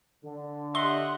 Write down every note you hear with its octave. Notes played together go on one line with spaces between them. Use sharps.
D3
G4 D#5 E5 F#5 C6